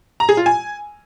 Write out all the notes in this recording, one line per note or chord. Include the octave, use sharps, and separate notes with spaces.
A#5
G#4
F4
G#5